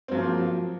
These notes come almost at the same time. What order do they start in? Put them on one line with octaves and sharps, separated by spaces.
C4 F#3 F3 A#3